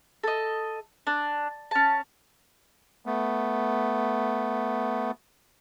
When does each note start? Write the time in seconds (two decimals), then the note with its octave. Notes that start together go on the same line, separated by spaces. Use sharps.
0.23 A4 D#5
1.07 D4
1.71 C#4 A5
3.06 A3 B3